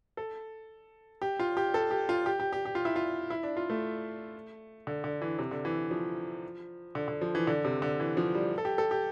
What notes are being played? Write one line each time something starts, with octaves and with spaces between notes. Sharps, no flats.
A4
G4
F4
G4
A4
G4
F4
G4
G4
G4
G4
F4
E4
F4
E4
D4
F4
A3
D3
D3
E3
C3
D3
E3
F3
D3
D3
F3
E3
D3
C3
D3
E3
F3
G3
A4
G4
A4
G4